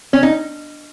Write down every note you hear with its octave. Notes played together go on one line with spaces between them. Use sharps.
C#4
D#4